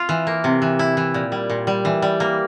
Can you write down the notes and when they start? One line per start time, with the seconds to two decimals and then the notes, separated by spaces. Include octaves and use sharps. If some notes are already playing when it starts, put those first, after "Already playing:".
Already playing: F4
0.09 E3
0.27 A#3
0.44 C3
0.62 E3
0.79 E4
0.97 E3
1.14 A#2
1.32 G3
1.50 A#2
1.67 G3
1.85 E3
2.02 G3
2.20 A#3